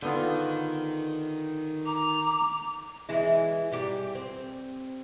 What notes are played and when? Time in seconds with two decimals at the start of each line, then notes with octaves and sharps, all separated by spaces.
0.03 D3 D#3 B3 F4
1.86 A#5 D6
3.09 E3 G#3 E4
3.71 G#2 G3 G4
4.15 C4